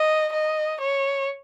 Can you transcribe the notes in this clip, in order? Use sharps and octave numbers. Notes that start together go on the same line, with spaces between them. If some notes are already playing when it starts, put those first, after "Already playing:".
Already playing: D#5
D#5
C#5